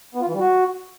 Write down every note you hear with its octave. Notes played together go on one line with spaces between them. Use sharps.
B3
F4
E3
G3
F#4